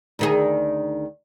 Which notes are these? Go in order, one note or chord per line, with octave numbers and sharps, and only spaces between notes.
D2 D#3 G#4